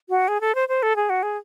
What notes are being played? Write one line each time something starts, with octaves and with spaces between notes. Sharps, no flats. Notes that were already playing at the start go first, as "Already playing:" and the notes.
F#4
G#4
A4
C5
C5
A4
G#4
F#4
G#4